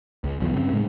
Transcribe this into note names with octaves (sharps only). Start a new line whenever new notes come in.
C#2
D#1 B1 E2 F3
G2 C#3 C4
A2 G#3